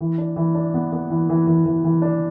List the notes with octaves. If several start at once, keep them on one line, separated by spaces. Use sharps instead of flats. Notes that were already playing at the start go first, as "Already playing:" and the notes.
E3
D4
E3
D4
B3
B3
E3
E3
E3
E3
E3
D4